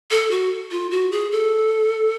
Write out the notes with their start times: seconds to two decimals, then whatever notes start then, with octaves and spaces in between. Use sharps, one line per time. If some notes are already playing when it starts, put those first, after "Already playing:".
0.11 A4
0.31 F#4
0.71 F4
0.91 F#4
1.12 G#4
1.32 A4